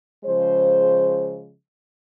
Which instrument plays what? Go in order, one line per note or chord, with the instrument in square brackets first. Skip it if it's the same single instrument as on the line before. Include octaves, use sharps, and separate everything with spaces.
[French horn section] C#3 F3 G#3 C5